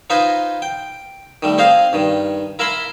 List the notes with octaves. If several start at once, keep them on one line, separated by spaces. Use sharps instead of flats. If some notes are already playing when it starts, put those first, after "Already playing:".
D#4 F4 B4 C5 D#5 G#5
G5
D#3 G3 A3
C4 G#4 C5 D#5 F5
G2 D#3
E4 A#4 E5 G#5 B5 C6